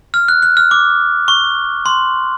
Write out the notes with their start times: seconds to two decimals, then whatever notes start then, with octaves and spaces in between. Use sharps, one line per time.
0.14 F6
0.28 F#6
0.43 F#6
0.57 F6
0.71 D6
1.28 C#6
1.86 C6